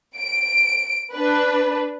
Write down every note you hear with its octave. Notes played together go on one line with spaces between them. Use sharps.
D7
D4 B4